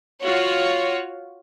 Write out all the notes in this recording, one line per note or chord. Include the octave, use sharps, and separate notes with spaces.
F4 F#4 C#5